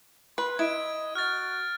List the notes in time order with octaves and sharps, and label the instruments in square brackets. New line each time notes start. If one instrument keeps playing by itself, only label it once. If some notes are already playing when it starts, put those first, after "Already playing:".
[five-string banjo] B4 [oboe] C6
[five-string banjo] E4 [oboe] D#5 [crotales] G#6 D7
[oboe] F#4 [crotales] F6 A6